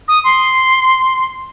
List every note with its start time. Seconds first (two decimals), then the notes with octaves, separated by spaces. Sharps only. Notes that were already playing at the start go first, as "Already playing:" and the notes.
0.08 D#6
0.24 C6